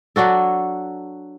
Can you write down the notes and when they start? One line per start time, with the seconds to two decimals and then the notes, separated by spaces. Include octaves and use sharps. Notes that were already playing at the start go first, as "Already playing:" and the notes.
0.16 F#3 D4 F#4 A4